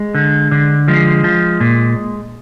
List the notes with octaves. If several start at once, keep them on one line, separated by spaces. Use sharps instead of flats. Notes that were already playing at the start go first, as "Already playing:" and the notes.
Already playing: G#3
D3
D3
F3 G#3
F3
A#2